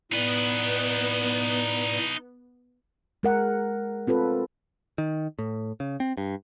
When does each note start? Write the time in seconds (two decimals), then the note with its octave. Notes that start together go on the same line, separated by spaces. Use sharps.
0.12 A2 B3 D#4 B4 D5
3.23 G#3 A#4 F#5
4.07 C4 F4 A4 B4
4.98 D#3
5.39 A2
5.80 C#3
6.00 C4
6.17 G2